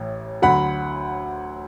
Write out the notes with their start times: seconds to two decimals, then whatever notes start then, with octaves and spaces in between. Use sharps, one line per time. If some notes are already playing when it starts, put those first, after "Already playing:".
Already playing: A1 A2
0.42 D2 D3 F#3 F#5 B5